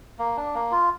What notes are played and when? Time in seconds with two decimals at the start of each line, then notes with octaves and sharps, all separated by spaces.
0.19 A#3
0.37 D4
0.54 A#3
0.71 F4